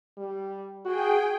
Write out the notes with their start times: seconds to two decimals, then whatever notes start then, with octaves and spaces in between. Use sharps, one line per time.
0.18 G3
0.85 F#4 G#4 G5